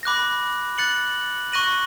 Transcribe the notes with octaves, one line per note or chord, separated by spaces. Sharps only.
B5 D6 F#6 A#6
F#6 A6 C#7 F#7
C#6 F#6 A#6 D#7 F#7